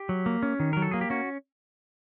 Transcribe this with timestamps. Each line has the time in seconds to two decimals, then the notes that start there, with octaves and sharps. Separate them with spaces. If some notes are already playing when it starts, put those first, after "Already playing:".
Already playing: G4
0.09 F#3
0.26 A#3
0.43 C#4
0.60 D#3
0.73 F#3 A#4
0.82 A4
0.91 A#3 G#4
1.01 G4
1.10 C#4 F#4